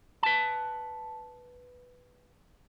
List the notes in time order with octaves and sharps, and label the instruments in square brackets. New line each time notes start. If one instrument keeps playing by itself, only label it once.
[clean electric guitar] B4 A5